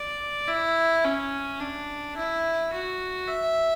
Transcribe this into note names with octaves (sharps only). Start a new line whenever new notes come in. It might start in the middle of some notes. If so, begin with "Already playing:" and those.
Already playing: D5
E4
C#4
D4
E4
F#4
E5